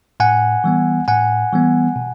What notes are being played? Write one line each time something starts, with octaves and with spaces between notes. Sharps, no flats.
A2 F#5 G#5
E3 G3 B3
A2 F#5 G#5
E3 G3 B3
B2